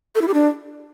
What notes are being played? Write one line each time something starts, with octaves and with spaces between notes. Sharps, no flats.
A4
E4
G4
D4